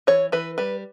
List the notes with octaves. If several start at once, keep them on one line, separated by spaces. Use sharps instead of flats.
E3 C#5
E3 B4
G3 B4